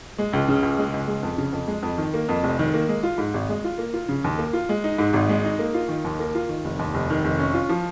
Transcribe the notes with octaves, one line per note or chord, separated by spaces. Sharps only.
G#3
C#2
C#3
C#2
G#3
C#2
G#3
F2
C#3
F2
G#3
F2
D#3
A#3
F2
F1
D#3
A#3
G#3
F4
G#2
G#1
G#3
F4
A#3
F4
C#3
D#2
A#3
F4
G#3
D#4
G#2
G#1
G#3
D#4
A#3
F4
D#3
D#2
A#3
F4
D#3
F1
D#2
F1
D#3
F1
C#4
F4
F3